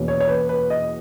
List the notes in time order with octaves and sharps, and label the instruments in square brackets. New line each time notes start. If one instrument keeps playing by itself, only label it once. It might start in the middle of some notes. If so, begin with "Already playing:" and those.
Already playing: [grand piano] E2 B2 A#3 C#4
C#5
C#5
B4
B4
D#5